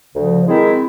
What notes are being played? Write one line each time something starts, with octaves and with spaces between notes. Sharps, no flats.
D2 C#3 F3
D#3 G#3 C4 E4